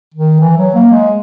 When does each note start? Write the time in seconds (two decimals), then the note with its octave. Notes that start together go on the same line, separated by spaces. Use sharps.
0.14 D#3
0.40 E3
0.57 F#3
0.75 A#3
0.91 G#3